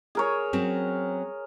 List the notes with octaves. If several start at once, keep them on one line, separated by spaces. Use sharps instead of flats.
G#4 A#4 C#5
F#3 C4 C#4